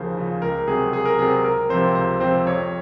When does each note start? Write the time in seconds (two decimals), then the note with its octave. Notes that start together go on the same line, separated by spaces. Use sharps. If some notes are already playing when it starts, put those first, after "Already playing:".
Already playing: D#2 C#3 F3 G#4 A#4 C5
0.17 C#3 F3
0.42 C#2 A#4
0.68 C3 F#3 C4 G#4
0.92 C#2 G#4
1.05 A#4
1.19 C3 F#3 C4 G#4
1.44 C#2 A#4
1.69 C3 F3 C4 C5
1.95 C#2 C5
2.20 C3 F3 C4 C5
2.47 F2 C#5